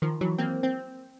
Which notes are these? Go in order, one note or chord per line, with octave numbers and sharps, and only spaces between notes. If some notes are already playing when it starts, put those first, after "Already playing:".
D#3 F3
E3 F#3
A#3 C4
C4